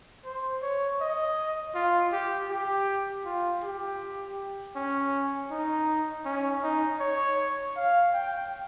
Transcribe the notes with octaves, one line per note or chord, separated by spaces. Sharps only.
C5
C#5
D#5
F4
G4
G4
F4
G4
C#4
D#4
C#4
D#4
C#5
F5
G5